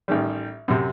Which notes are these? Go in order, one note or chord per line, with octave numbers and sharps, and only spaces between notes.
A1 D#3 G3
F#2 C3